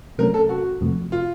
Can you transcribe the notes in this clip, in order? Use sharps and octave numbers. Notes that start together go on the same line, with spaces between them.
C3 F#3 A3 C#4 A#4
A4
F#4
F2 C3 F3 A3
F4